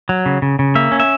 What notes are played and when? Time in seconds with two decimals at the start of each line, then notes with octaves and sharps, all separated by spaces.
0.09 F#3
0.26 C#3
0.42 C#3
0.59 C#3
0.75 A#3 E5
0.92 C#4
1.00 E5